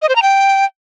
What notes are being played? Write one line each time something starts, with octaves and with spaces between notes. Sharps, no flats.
D#5
C5
A#5
G5